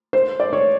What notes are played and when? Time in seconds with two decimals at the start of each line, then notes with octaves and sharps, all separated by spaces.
0.13 C5
0.40 D5
0.53 C#5